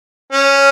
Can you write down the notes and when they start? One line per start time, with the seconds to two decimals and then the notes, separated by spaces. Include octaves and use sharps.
0.33 C#4